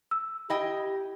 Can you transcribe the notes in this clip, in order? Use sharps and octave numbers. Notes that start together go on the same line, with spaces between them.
E6
E4 G4 D#5 G5